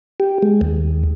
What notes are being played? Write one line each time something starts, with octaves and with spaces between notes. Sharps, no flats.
G4
G#3
D#2